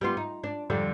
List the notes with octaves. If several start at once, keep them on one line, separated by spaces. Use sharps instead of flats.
G3 B3 F4
D#4
D4
F2 D3 G3